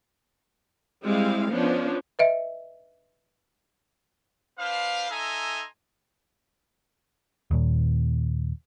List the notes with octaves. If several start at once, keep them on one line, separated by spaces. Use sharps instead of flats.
G3 G#3 C4 E4 F5
F3 B3 C#4 D4
B4 D#5 E5
D4 B4 C5 F5
D#4 A4 E5 G#5 A#5 C6
D#2 A#2